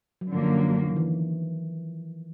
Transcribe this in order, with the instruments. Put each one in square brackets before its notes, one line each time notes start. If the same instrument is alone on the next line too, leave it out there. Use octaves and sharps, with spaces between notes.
[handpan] F#3
[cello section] F#2 D3 F#3 A#3 [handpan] F3
[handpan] D#3
E3